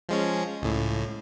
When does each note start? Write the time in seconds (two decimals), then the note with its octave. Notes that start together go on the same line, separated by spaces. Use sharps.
0.09 F3 G#3 C#4
0.62 C#2 A2